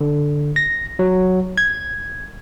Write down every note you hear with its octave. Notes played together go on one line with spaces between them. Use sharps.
D3
A#6
F#3
G#6